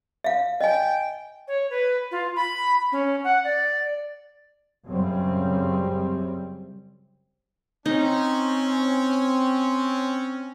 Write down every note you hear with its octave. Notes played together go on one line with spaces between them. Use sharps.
E5 F5
D#5 G5 G#5
C#5
B4
F4
B5
C#4
F#5
D5
F#2 C#3 G3 C4
C4 C#4 D#4